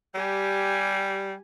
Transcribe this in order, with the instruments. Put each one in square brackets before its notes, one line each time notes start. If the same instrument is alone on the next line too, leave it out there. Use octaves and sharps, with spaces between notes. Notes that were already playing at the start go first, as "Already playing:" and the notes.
[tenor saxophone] G3 [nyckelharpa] G4 G#5